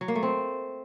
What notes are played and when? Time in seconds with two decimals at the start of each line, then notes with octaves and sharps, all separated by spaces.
0.01 F#3
0.08 A#3
0.15 A3
0.23 C4